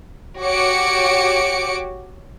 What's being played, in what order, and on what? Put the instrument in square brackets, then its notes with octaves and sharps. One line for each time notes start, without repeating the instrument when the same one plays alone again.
[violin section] F#4 G4 C#5 D6 C#7 D7